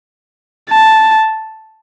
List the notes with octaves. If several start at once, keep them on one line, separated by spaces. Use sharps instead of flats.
A5